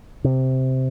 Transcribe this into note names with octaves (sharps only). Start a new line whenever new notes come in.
C3